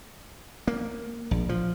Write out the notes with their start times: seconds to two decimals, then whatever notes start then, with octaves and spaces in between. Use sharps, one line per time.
0.67 A#3
1.31 A#1
1.49 F3